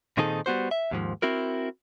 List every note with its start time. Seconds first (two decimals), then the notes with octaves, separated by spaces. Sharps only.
0.17 A#2 D#3 C4 D#4 G#4 A4
0.46 G3 B3 F#4 C5
0.71 E5
0.91 D#2 G#2 F3
1.22 C4 E4 F#4 A#4